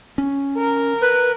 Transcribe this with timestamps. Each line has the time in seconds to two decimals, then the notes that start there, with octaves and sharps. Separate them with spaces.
0.18 C#4
0.57 A#4
1.01 B4